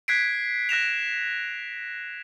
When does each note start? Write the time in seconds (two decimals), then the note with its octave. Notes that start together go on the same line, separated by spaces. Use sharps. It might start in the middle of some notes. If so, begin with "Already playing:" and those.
0.08 F#6 G#6 B6 C7 D7
0.69 F#6 A#6 E7 F7